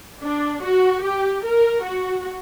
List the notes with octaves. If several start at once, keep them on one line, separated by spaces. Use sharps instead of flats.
D4
F#4
G4
A#4
F#4